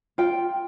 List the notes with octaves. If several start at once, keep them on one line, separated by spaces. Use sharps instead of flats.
F4 G5